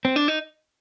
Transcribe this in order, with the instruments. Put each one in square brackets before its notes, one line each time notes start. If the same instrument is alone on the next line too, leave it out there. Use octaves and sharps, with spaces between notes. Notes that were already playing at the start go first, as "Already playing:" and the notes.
[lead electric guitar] C4
D4
D#4